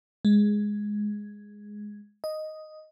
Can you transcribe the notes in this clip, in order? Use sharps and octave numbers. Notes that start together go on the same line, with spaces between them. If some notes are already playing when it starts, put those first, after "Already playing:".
G#3
D#5